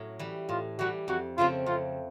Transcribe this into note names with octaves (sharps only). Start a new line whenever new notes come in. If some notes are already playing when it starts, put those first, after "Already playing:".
Already playing: A2 F#3 C#4 E4
E3 G3
A2 F4
E3 G3 F#4
F2 F#4
C#3 F3 A3 C4 F4
F2 F4